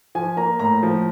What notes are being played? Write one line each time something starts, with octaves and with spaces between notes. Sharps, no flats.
F3 G#5
A#3 A#5
A2 A#5
F3